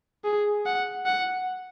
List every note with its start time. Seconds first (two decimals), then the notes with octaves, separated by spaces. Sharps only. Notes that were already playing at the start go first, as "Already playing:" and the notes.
0.24 G#4
0.66 F#5
1.06 F#5